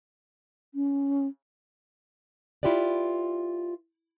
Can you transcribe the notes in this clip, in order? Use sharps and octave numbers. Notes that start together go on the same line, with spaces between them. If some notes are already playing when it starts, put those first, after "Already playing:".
C#4
E4 F4 G4 B4 D5